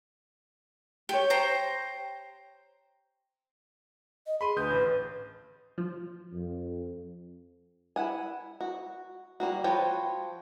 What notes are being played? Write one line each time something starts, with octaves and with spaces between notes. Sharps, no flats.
G4 C#5 G5
C5 G5 A#5
D#5
G#4 B5 C6 D#7
D2 B4 D#6 G6
A1
F3
F2
E4 F#5 G#5
F#4
G3 A#3 F#4
F3 F#4 B4 C#5 G5